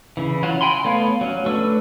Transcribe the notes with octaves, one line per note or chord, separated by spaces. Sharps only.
C#3 E3
F#3 F4 F#4
G5 G#5 B5 C6
A3 B3 C#5 F5
F#3 C#4
A3 D4 B4 C#6 E6